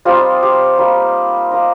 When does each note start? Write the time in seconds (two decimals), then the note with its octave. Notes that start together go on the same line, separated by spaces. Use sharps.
0.05 G3 C4 D#4 F4
0.43 G4
0.78 G3 A#3 D#4
1.51 A#3 D#4